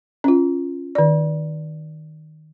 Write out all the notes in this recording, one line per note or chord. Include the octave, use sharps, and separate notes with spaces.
C#4 F4
D#3 D5